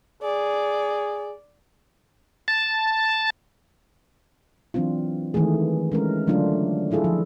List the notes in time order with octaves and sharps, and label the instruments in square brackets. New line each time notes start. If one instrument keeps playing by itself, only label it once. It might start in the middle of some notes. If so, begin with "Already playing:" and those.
[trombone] G#4 [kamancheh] D5
[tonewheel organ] A5
[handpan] E3 F#3 C4 D4 F4
D#3 E3 G#3 A3 G#4
G#3 C#4 A#4
D3 F#3 A3 D4 F4 F#4
F#3 E4 F4 G#4 A4
F3